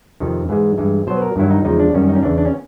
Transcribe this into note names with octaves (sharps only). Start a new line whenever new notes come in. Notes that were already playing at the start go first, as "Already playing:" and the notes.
F2 C3 D#3
G#2 E3 G#3
G2 E3 G#3
B2 F#3 C5
B4
A#4
G2 D#3 F#3 E4
D#4
E2 C#3 F3 G#3 D#4
D4
F#2 D#3 G3 C#4
D#4
C#4
E2 C#3 E3 D4
D4
C#4